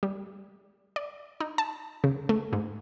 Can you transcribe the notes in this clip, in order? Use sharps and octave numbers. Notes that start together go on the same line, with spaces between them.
G3
D5
D#4
A5
C#3
A3
G#2